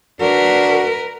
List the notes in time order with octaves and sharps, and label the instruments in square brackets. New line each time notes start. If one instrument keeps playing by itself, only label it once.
[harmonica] D4 F#4 [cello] A#4 B4